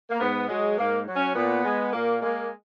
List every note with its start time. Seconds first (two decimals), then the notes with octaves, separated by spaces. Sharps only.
0.10 A#3
0.20 G#2 B3
0.49 F#3 G#3
0.78 G#2 A#3
1.07 F#3
1.16 C#4
1.35 A#2 B3
1.65 G#3
1.93 A#2 A#3
2.22 G#3 A#3